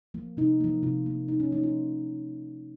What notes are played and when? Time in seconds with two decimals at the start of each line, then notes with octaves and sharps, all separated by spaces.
0.14 F3 A#3
0.37 C3 D#4
0.61 F3 A#3
0.83 C3 F4
1.06 F3 A#3
1.28 C3 D#4
1.40 C#4
1.51 F3 A#3 D#4
1.63 F4